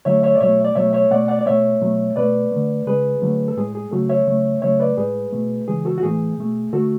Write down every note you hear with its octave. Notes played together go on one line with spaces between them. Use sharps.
D3 F#3 A3 C#5 E5
C#5 E5
D5
B2 F#3 A3 C#5 E5
D5
B2 F#3 A3 C#5 E5
C#5 E5
B2 A3 D5 F#5
D5 F#5
D5
B2 A3 C#5 E5
B2 F#3 A3
B2 A3 B4 D5
D3 A3
C#3 G#3 G#4 B4
D3 F#3 A3
A4
A2 G#3 G#4
G#4
C#3 F#3 A3 F#4 A4
C#5 E5
C#3 F#3 A3
C#3 F#3 A3 C#5 E5
B4 D5
A2 G#3 G#4 B4
B2 A3
C#3 E3 G#3 G#4
F#4 A4
F#4
A2 E3 A3 G#4
B2 A3
D3 A3 F#4 A4